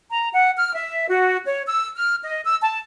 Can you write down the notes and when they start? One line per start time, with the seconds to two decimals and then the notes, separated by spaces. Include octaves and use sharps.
0.10 A#5
0.34 F#5
0.58 F6
0.75 E5
1.09 F#4
1.46 C#5
1.67 E6
1.96 F6
2.23 D#5
2.46 E6
2.62 A5